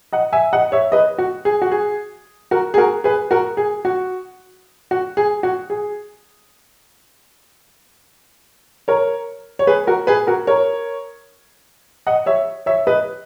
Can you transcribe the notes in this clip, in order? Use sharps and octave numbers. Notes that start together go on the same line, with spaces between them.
D#5 F#5
E5 G#5
D#5 F#5
C#5 E5
B4 D#5
F#4
G#4
F#4
G#4
F#4 A#4
G#4
F#4 A#4
G#4 B4
F#4 A#4
G#4
F#4
F#4
G#4
F#4
G#4
A#4 C#5
C#5
G#4 B4
F#4 A#4
G#4 B4
F#4 A#4
A#4 C#5
D#5 F#5
C#5 E5
C#5 E5
B4 D#5